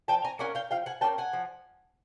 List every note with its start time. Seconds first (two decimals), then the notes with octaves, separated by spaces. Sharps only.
0.08 F3 G5 A5
0.24 G#5 A#5
0.39 A#3 C#4 F#5 G#5
0.55 F5 G5
0.71 F3 F5 G5
0.86 F#5 G#5
1.01 A#3 C#4 G5 A5
1.18 F#5 G#5
1.33 F3